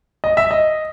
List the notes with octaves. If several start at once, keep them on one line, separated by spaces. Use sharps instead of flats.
D#5
E5
D#5